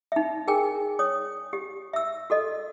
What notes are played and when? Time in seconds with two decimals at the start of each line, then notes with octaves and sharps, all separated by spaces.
0.12 D#4 E5
0.48 G#4 A#4 G5 G#5
0.99 C#5 D#6
1.53 G4
1.93 E5 E6
2.30 F#4 A4 D#5